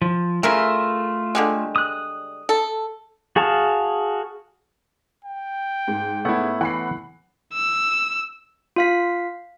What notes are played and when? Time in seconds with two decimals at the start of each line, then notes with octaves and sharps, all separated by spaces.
0.02 F3
0.43 C#3 A3 E4 F4 A#4 E5
1.35 D3 G3 G#3
1.76 D#6 F#6
2.49 A4
3.36 F#4 G#4 F5 A5
5.25 G5
5.88 G#2
6.25 A3 B3 C#4 E4 F#5
6.61 E3 F#5 B5 C7
7.53 E6
8.76 F4 F5 B6